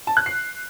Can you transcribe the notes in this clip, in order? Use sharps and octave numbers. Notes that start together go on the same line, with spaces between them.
A5
F#6
C7